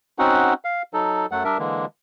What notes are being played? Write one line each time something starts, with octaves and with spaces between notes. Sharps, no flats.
C4 C#4 D#4 F#4 F#5
F5
F#3 D#4 A4
F#2 F#3 A3 F#5
G3 D4 A#4 E5
D3 E3 G#3 A#3